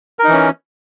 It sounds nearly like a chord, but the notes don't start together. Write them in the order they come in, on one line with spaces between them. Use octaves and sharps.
A#4 D#4 E3 C#4